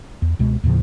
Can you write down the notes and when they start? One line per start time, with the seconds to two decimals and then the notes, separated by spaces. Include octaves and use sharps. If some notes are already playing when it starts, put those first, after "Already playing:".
0.22 E2
0.39 C#2 B2 G#3
0.64 D#2 A2 C#3 F3